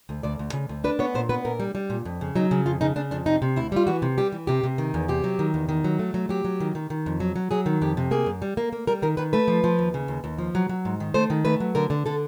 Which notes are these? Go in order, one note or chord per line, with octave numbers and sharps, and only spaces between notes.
D2
D2 D5
D2
C#3
D2
D4 B4
B3 C#5
A#2 C5
B3 B4
A#2 A#4
G3
G3
A#2
F2
C#3
F#3 D#4
C#3
F2 F4
C#3 D#4
C#3 D4
F2 D4
C3 D#4
C3
D2 E4
G3 F4
E3 F#4
C3
G3 G4
E3
C3 G4
C3
D#3
E2
C3 G4
F#3
D#3
E2
D#3
F#3
A3
F#3
F#3 G4
F#3
D#3
D#3
D#3
F2
F#3
F#3
F#3 G#4
D#3
F2 G4
C3
A#3 G#4
F#2
G3
A#3
A#3
G3 A#4
D#3 A#4
D#3 B4
A3 B4
F3
F3
D#2
C#3
D#2
D#2
F3
F#3
F#3
G#2
D#3
A3 C5
D#3
A3 B4
F#3
D3 A#4
D3
D3 A4